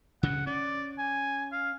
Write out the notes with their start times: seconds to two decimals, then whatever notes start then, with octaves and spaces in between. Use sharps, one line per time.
0.23 D2 G2 C#3 F#5
0.47 C#4 D5
0.99 G#5
1.52 F5